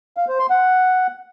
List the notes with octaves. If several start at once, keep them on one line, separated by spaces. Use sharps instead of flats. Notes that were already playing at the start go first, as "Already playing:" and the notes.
F5
C5
C6
F#5